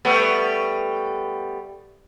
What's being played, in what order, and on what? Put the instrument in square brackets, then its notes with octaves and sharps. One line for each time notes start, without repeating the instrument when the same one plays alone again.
[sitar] G3 A3 B3